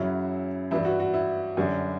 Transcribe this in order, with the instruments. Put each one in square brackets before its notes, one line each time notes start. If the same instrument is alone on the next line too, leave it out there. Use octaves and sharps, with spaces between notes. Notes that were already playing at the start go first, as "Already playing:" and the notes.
Already playing: [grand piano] F#2 C#3 F#3 E4
G2 E3 G3 E4
F#4
F#4
E4
F#2 D3 G3